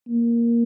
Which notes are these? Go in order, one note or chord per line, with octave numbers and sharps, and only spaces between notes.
A#3